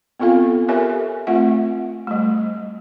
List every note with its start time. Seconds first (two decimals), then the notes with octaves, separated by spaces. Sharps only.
0.19 B3 C4 F4 A4 F5
0.68 G4 A4 A#4 C#5 E5 G#5
1.27 A3 C4 F4 E5 F#5
2.07 G3 A3